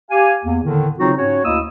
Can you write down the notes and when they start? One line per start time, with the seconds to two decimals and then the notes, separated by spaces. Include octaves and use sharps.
0.11 G4 F5 G#5
0.44 E2 A#3
0.63 A2 D3 D#3
0.99 C#3 F#3 C4 D#4 F4 F#4
1.17 G#2 C#4 F#4 C#5
1.44 D2 A#3 E4 D#5 D#6 E6